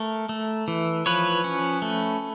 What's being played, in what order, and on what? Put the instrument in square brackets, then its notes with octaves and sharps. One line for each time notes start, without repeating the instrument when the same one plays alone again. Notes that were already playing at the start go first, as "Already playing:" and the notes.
Already playing: [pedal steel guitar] A3 A#4
A3
E3
F3 B4 C#5
C#4
A3